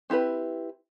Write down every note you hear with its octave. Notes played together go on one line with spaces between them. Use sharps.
C4 E4 G4 B4